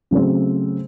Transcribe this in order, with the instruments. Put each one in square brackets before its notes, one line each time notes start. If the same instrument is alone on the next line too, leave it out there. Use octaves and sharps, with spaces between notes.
[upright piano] C#3 F#3 A3 C4